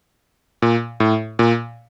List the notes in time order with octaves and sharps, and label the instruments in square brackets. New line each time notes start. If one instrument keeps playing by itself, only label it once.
[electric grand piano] A#2
A2
A#2